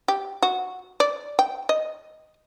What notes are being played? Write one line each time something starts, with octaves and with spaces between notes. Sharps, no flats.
G4
F#4
D5
G5
D#5